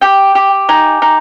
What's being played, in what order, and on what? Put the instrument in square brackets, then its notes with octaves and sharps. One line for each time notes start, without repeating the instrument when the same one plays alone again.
[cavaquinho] G4 G5
G4
D#4 G#5
D#4